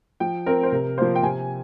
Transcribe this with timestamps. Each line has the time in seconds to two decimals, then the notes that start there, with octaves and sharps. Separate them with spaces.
0.20 F3 G5
0.46 C4 A#4
0.63 C5
0.72 C3 A#4
0.98 F3 A#3 C5
1.15 G5
1.23 C3 G#5